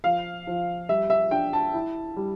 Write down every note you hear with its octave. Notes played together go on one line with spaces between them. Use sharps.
F3 F5
F3
G3 E5
E5
D4 G5
A5
E4
G3